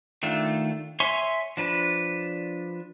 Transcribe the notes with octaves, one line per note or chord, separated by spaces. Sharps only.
D#3 A3 D4 F4
C#5 E5 G#5 C6 C#6
F3 D4 B4